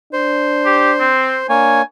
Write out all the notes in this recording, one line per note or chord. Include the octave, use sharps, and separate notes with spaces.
D4 C5
G4
C4
A#3 D4 C#5 G#5